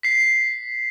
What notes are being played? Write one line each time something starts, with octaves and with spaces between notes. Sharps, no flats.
B6 C7